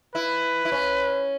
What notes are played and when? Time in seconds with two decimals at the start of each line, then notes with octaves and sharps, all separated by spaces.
0.15 E4 B4
0.65 E4
0.72 C#4